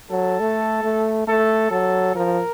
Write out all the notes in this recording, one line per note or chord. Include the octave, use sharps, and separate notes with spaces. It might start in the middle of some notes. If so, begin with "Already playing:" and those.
F#3 A4
A3
A3
A3 A4
F#3 A4
F3 A#4